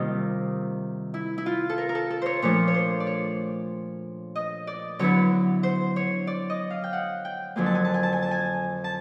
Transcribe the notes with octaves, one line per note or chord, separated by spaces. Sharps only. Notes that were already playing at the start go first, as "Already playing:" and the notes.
Already playing: C3 D#3 G3 A#3 D#4 F4
E4
E4
F4
A4
A#4
A#4
A4
A4
C5 C#5
A#2 F3 A3 D4 C#5
C#5
C5
D5
C#5
D#5
D5
D3 F#3 B3 E4 C#5
C5
C#5
D5
D#5
F5
G5
F#5
G5
F2 D3 F#3 A#3 G#5
A5
G#5
A5
G#5
A5
G#5
A5
G#5
A5